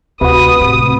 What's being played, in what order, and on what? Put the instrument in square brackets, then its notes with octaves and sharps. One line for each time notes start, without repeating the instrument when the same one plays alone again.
[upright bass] D2 [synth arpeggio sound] C3 F#4 [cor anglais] B4 [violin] D#6
[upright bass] A2 G#3